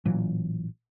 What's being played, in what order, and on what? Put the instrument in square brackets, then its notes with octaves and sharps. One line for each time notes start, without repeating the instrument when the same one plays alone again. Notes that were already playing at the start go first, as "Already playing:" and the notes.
[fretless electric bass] A1 A#2 E3 F#3